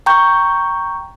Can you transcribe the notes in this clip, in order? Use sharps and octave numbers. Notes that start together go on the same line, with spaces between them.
G5 A#5 C#6 G6